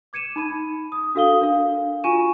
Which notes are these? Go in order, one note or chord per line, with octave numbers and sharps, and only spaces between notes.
D6 G#6 C#7 D#7 E7
D#4 B5 D#7
D#6
D4 F#4 A4 F5 D#6 G7
D4 A#4 F5
F4 F#4 G#5 C#6 D#7 E7